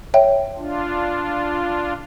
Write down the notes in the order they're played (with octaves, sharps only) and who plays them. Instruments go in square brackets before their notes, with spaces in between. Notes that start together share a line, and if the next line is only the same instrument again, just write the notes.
[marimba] C#5 E5 G5
[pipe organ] D4 F4